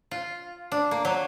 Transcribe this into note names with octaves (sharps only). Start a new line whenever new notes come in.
F4
D4
A#3
F#3